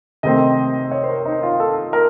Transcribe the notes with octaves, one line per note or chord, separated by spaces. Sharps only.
C3 D#3 A3 C4 D#5
C#5
C5
A#4
D#4
F4
A4
A#4